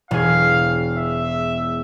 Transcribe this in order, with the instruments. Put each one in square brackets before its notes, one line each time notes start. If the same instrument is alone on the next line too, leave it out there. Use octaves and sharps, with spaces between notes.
[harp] E1 G#4 [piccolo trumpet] F5
[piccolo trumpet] E5